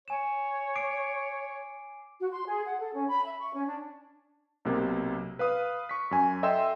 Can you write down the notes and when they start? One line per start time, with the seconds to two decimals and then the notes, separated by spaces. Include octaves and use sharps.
0.08 C#5 G#5 E7
0.76 D6 C7 D7
2.19 F#4
2.31 C6
2.45 G#4
2.65 F#5
2.80 A4
2.93 C#4
3.07 B5
3.24 E5
3.39 C#6
3.53 C#4
3.66 D4
4.65 B1 C3 A#3
5.39 B4 F5 D#6
5.89 C#6 B6
6.11 F#2 G#5
6.43 A4 D#5 E5 G5 C6 E6